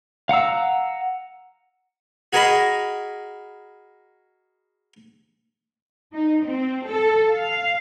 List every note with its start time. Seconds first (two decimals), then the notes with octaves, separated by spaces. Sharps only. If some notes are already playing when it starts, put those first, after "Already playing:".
0.29 F5 F#5 A#5 E6
2.33 F#4 G#4 A#4 D#5 A#5 B5
6.13 D#4
6.42 C4
6.86 A4
7.34 F5